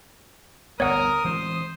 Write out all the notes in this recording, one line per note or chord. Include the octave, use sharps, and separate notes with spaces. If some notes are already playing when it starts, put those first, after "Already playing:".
G1 D2 B3 A#4 C#5 D5 F#5 D#6
E3 G#3 C4 C5